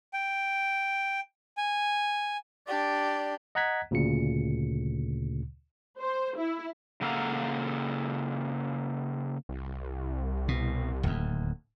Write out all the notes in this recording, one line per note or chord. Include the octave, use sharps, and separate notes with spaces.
G5
G#5
D4 G4 D5
D#5 F#5 A#5 F#6 G#6 B6
D2 A#2 C#3 C#7
C5
E4
C#3 A#3 A4 F5 F#5 A#5
C2
B2
D1 D#2